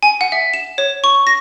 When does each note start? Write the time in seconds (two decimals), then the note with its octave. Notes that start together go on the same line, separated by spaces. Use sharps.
0.03 G#5
0.21 F#5
0.32 E5
0.54 E7
0.78 C#5
1.04 C#6
1.27 A#6